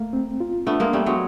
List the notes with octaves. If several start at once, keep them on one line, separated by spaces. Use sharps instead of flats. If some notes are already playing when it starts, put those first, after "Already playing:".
Already playing: A3 A#3
C4
F4
A3 B3 D4
G#3 A#3
G3 A3 B3
F#3 G#3